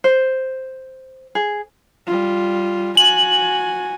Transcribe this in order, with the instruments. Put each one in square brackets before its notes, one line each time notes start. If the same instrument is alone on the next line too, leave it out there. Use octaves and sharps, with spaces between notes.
[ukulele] C5
G#4
[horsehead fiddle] G3 F4
[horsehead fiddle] F#4 G#5 [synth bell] F#7